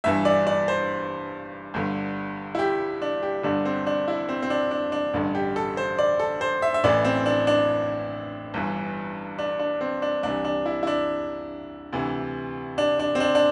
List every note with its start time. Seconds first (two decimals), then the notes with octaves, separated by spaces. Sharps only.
0.04 G1 G2 E3 E5
0.25 D5
0.47 D5
0.68 C5
1.74 G1 G2 D3
2.55 E4
2.59 G4
3.02 D4
3.23 G4
3.43 G1 G2 D3 D4
3.65 C4
3.86 D4
4.08 E4
4.29 C4
4.42 C4
4.50 D4
4.71 D4
4.92 D4
5.14 A1 G2 D3
5.35 G4
5.56 A4
5.77 C5
5.99 D5
6.19 A4
6.41 C5
6.62 E5
6.74 E5
6.84 A1 A2 E3 D5
7.05 C4
7.26 D4
7.47 D4
8.54 G1 G2 E3
9.39 D4
9.59 D4
9.81 C4
10.02 D4
10.23 C2 C3 E3 D4
10.45 D4
10.66 E4
10.83 E4
10.87 D4
11.93 D2 C3 E3
12.78 D4
12.99 D4
13.15 C4
13.20 D4
13.35 D4